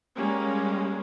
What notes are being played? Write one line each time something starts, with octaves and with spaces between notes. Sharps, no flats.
G3 G#3 A#3 C#4